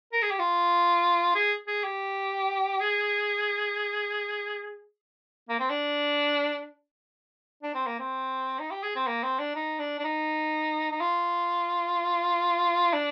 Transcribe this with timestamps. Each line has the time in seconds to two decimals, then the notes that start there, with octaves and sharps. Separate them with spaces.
0.13 A#4
0.22 G#4
0.30 G4
0.39 F4
1.35 G#4
1.67 G#4
1.84 G4
2.80 G#4
5.49 A#3
5.60 C4
5.70 D4
7.63 D4
7.75 C4
7.87 A#3
7.99 C4
8.59 D#4
8.71 G4
8.83 G#4
8.96 C4
9.07 A#3
9.23 C4
9.39 D4
9.56 D#4
9.79 D4
9.99 D4
10.04 D#4
10.91 D#4
11.01 F4
12.93 D4